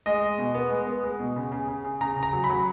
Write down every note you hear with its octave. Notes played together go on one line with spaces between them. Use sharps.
G#3 D#5
G#3
B2
B3
G#3
B3
G#3
B2
C#3
C#3
C#3
C#3
C#3 A#5
C#3
A#5
F#3
B5
F#3